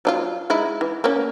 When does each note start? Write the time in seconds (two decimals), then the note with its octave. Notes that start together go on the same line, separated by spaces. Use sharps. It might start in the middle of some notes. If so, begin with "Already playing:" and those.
0.05 F#3 D4 F4
0.50 G#3 D#4 E4
0.81 E3
1.04 A#3 C#4